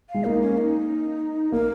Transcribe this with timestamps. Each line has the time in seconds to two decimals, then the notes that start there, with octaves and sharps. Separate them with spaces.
0.10 G#3 F5
0.25 A#3 D#4
0.42 C#4
0.58 D#4
1.52 A#3 A#4